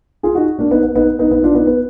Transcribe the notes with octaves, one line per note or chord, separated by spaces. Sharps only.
F4 G#4
D#4 F#4
A#3 D4
B3 D#4
B3
B3 D#4
B3 D#4
B3 D#4
D4 F4
B3 D#4
B3